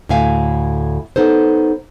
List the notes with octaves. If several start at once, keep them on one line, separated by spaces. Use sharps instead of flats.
D2 A2 E4 E5 F5 G#5
B3 D#4 A4 C5